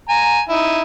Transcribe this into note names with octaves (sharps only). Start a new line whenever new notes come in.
G#5 A#5
D#4 E4